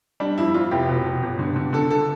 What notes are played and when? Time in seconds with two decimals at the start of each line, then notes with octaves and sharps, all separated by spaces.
0.20 G3 D4
0.38 F2 E4
0.54 F2 F4
0.71 F1 G4
0.88 B2
1.06 B2
1.23 G1
1.39 D3
1.56 D3
1.73 D3 A4
1.90 A4